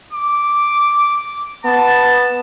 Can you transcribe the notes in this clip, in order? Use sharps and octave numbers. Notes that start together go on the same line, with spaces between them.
D6
B3 A5